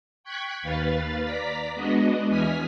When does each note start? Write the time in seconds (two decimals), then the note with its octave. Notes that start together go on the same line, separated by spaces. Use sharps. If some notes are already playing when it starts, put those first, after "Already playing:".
0.24 G5 C#6 F#6 G#6 B6
0.63 D#2 B4 F5 A6
1.25 D5 A#5 B6
1.75 G#3 B3 D4 F#4 D#5
2.30 E2 E3 G#5 D#6 F6 B6